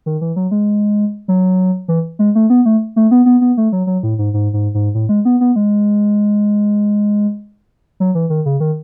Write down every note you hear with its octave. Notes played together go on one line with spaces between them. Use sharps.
D#3
E3
F#3
G#3
F#3
E3
G#3
A3
B3
A3
A3
B3
B3
B3
A3
F#3
F#3
A2
G#2
G#2
G#2
G#2
A2
G#3
B3
B3
G#3
F#3
E3
D#3
C#3
D#3